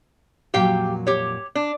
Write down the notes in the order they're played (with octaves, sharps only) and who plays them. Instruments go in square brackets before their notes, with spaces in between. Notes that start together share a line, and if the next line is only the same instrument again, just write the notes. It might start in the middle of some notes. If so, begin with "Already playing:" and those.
[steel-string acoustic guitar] F2 A#2 F#3 [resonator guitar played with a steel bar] G4 F5 G5
[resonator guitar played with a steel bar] G4 C#5
D4